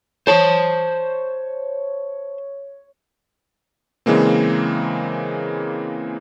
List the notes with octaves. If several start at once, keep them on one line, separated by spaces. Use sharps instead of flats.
C5 C#5 A5
C#3 E3 G#3 A#3 C4